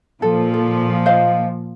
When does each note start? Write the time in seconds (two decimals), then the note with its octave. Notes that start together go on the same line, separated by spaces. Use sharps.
0.22 A#2 F3 A4
0.54 A4
1.06 C5 D#5 F5